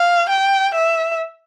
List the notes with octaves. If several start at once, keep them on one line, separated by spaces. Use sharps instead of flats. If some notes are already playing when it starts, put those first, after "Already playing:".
Already playing: F5
G5
E5